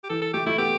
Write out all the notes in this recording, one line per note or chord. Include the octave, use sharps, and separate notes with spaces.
G4
E3 A4
A4
A3 G4
A3 E4
B3 G4